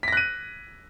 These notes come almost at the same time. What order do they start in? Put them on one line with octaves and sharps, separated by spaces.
B6 A#6 F#6 D#7